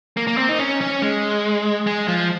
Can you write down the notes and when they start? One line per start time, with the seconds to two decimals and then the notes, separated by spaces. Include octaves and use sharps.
0.17 A#3
0.27 A#3
0.37 C4
0.49 D#4
0.59 C#4
0.81 C#4
1.02 G#3
1.87 G#3
2.08 F3